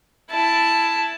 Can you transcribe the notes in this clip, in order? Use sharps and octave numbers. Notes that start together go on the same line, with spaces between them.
E4 A5